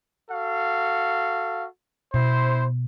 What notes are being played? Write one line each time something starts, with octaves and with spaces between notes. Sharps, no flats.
F#4 A4 F5
B2 E4 C5